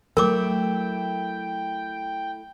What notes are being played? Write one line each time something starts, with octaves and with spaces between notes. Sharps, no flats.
F#3 A3 E4 A#4 G5 D6